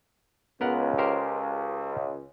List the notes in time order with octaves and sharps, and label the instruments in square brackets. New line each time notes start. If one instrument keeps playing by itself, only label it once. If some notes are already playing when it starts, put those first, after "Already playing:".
[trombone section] C#2 [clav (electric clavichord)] B3 A#4 F#5
[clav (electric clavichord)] G4 A#4 C5